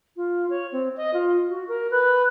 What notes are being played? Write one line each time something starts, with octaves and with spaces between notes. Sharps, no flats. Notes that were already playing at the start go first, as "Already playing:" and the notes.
F4
C#5
C4
D#5
F4
F#4
A#4
B4